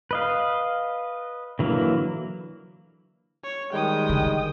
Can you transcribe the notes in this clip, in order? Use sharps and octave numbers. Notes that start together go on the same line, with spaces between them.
B4 D#5 F5
D3 E3 F#3 A#3
C#5
D#3 G3 G#3 G5 D#6
D3